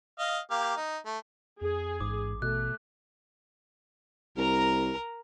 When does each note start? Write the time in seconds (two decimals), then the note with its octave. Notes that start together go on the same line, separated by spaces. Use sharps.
0.19 D#5 F5
0.51 A#3 G4 F5
0.76 D#4
1.06 A3
1.61 F2 G#4
2.01 A1 G#2 D6
2.42 B2 A3 F#6
4.37 C2 A#4 A#5